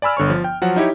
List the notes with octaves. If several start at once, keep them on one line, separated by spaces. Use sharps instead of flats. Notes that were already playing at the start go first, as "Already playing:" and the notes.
D5 G#5 B5 E6 F6
G1 D3 C#5 C#6
F3
G5
F3 F#3 F#5
D#4 E4 G4 C#5